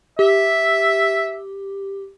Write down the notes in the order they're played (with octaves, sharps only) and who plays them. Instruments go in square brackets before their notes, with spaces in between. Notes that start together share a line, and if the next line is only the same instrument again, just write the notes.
[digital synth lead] G4 [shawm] E5